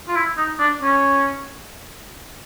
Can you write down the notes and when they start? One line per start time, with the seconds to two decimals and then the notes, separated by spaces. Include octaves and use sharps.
0.08 F4
0.15 E4
0.38 D#4
0.59 D4
0.82 C#4